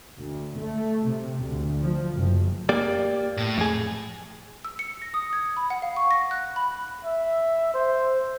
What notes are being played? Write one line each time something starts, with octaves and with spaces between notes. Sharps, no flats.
D2
A3
C3
D2
F3
F#1
A#3 G4 D5
A2
F2 G#4
E6
C#7
A#6
D#6
G#6
B5
F#5
F5
C#6
A#6
F#6
B5
E5
C5